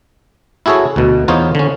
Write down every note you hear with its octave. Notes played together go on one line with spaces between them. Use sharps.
E4 F#4 G#4 A4 C#5
D2 B2
E2 B3 D#4 F4 C5 C#5
D3 C#4